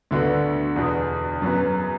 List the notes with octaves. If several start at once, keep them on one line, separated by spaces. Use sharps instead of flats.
D2 D3 B3 F#4
E2 B2 B3
F#2 F#3 B3